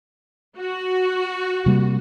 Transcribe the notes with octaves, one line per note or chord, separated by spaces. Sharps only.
F#4
C3 G3 A#3